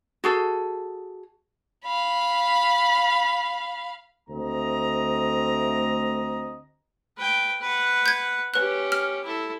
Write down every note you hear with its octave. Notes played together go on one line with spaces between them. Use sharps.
F#4 G#4 A4
F5 B5
D2 A3 C4 D#5 A#5
B4 G5
B4 F#5
G6 G#6
C#4 G4 B4 F#6
F6
E4 A4